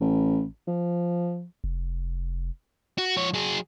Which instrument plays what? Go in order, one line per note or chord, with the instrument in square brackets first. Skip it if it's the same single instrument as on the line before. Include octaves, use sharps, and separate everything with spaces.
[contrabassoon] A1
F3
[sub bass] F1
[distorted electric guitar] F#4
F3 C#5
F#3 G#4